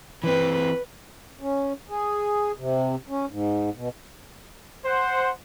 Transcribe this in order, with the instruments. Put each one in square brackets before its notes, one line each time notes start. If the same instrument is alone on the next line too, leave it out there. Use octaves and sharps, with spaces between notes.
[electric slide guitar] E3 C4 [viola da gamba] B4
[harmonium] C#4
G#4
C3
C#4
G#2
B2
[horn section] C5 F#5